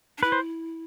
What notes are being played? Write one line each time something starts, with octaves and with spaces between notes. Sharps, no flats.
D4
E4 B4
C5